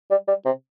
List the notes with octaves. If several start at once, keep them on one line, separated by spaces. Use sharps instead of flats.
G3
G3
C3